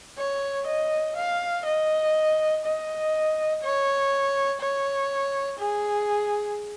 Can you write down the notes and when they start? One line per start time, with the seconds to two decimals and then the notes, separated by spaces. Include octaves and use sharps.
0.18 C#5
0.67 D#5
1.17 F5
1.65 D#5
2.64 D#5
3.62 C#5
4.61 C#5
5.59 G#4